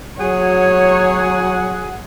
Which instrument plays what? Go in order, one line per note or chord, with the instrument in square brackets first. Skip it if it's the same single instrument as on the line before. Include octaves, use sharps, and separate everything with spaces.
[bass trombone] F#3 [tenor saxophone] G#4 [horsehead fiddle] C#5 [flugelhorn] F#5